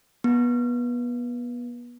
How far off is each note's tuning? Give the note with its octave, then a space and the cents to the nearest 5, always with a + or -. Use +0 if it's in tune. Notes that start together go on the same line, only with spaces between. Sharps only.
B3 -25